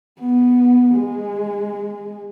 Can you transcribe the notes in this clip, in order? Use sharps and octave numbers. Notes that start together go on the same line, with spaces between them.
B3
G#3